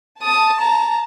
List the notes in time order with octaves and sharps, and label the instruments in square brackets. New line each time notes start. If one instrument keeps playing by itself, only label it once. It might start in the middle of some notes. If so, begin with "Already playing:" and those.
[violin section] A5 [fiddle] D#6
[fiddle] A#5